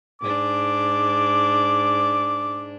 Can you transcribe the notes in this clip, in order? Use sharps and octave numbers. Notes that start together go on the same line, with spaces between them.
G#2 D4 D6